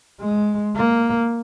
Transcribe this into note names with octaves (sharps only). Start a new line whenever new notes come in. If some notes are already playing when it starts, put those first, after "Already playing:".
G#3
A#3